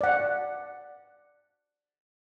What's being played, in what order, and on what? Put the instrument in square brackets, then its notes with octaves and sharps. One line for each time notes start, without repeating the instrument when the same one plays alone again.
[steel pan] D5 F#5